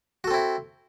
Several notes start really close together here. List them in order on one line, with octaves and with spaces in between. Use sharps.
F#4 A4 C4 E4